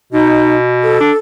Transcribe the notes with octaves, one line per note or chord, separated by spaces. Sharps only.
B2 D#4
A4
D4